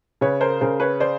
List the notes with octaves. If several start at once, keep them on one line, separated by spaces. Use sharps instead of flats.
C#3 B4 C#5
A#4 C5
C#3 A#4 C5
B4 C#5
C5 D5